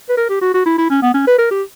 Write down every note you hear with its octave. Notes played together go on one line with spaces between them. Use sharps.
B4
A#4
G4
F#4
F#4
E4
E4
C#4
B3
C#4
B4
A#4
G4